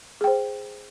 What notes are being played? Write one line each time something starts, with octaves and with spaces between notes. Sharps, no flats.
G#4 C5 G5